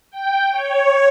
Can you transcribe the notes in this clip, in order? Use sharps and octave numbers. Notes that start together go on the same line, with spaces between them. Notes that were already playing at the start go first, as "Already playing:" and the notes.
G5
C#5